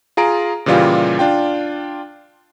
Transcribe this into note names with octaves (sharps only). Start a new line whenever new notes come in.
F4 G#4 A#5 D7
A#2 C#3 E3 G3 F4 G4
D4 F4 G5